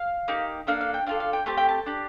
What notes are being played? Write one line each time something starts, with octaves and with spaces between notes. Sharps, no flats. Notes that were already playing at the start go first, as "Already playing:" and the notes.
Already playing: F5
A#3 D#4 G4
A#3 D4 A4 F5
F5
G5
D4 F4 A4 F5
F5
G5
A3 C4 G4 A5
G5
A5
D4 G4